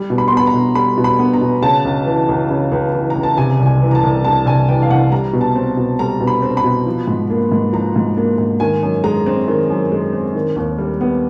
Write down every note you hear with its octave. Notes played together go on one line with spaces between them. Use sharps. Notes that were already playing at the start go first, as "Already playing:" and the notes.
Already playing: G3
B2
B5
B3 C6
B5
A#5
B2
G3 B5
B2
B5
B3
A#5
B2
C#3 A5
C#2
E3
C#2
C#3
C#2
E3
A#5
C#2
A5
C3 G#5
C2
G#5
E3
A#5
A5
C2
C3 A5
C2 G#5
E3 G5
F5
C2 F#5
G3 A#5
B2
A5
C4
B2
G3 A#5
B2
B5
C4
B5
B2
F3
G#2
A#3
G#2
F3 A#5
G#2
A#3
G#2
D#3 G#5
F#2
G#3 A#5
C4
D#3
F#2
G#3
C4
D#3
D#2
G3
B3